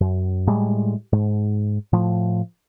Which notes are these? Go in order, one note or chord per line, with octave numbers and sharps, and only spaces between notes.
F#2
A2 G3 G#3
G#2
A2 F3